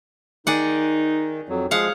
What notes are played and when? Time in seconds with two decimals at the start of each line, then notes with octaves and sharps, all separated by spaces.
0.47 D#3 D#4 G#4 D5 F#5
1.49 F2 F#3
1.71 F3 G#3 G#4 F5 F#5